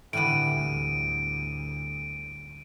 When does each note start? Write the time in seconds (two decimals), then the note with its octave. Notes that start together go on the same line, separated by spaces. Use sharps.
0.13 A2 D3 E3 G3 B3 D7 D#7
0.52 D2